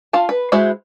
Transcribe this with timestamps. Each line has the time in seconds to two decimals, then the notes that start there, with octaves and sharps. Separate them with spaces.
0.13 F4 F5 A5
0.29 B4
0.52 G#3 E4 F#4 C5 E5